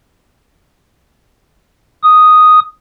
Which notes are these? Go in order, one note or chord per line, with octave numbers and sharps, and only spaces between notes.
D#6